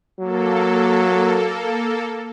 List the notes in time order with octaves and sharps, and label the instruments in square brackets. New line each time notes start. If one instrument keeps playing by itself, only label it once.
[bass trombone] F#3 [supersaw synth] A#3 A4